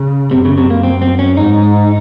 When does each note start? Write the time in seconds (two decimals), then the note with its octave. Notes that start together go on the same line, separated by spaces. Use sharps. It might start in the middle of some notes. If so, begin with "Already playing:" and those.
Already playing: C#3
0.31 F#2 C3
0.45 C#3
0.58 C3
0.70 A#3
0.83 C4
1.02 C4
1.19 C#4
1.37 G#2 D#4